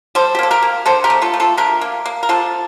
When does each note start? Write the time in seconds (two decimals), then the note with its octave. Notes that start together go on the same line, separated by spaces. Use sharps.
0.15 G3 A4 C5
0.35 G4
0.39 A#3 A4
0.51 G4 A#4
0.62 A#3
0.86 D3 A4 C5
1.04 G4 A#4
1.10 A3
1.22 F4 A4
1.34 A3
1.40 F4 A4
1.57 D3 G4 A#4
1.81 A#3
2.06 A#3
2.23 A#4
2.29 C3 F4 A4